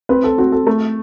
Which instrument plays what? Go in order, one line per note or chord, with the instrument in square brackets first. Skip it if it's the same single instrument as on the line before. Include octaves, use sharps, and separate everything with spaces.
[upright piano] C4 [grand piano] B4
[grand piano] A4
[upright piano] C4 [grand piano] F#4
[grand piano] A4
[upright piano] A3